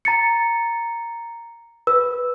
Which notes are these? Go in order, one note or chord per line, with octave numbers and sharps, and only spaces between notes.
A#5 A6 C#7
B4 E6